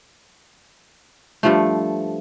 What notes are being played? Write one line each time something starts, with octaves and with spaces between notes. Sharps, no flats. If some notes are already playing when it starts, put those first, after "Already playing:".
G2 F3 A3